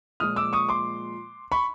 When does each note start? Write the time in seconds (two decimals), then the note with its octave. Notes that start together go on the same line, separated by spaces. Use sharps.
0.20 A#2 F3 G#3 D#6 F6
0.36 D6 E6
0.53 C#6 D#6
0.69 C6 D6
1.52 B5 C#6